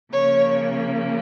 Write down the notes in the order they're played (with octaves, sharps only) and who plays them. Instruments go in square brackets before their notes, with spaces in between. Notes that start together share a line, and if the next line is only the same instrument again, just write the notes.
[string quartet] C#3 F3 A#3 C#5